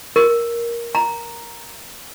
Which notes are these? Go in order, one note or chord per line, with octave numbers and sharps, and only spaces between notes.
A#4
A#5